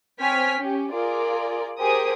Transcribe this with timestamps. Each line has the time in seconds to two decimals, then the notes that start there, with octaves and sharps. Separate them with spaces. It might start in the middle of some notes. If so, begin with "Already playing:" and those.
0.20 C4 C#5 G5 G#5 F6 B6
0.60 C#4 G4
0.91 F4 G#4 A#4 D5
1.79 G4 G#4 A#4 C5 D#6